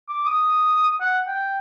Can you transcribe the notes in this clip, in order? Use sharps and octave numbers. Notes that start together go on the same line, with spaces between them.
D6
D#6
F#5
G5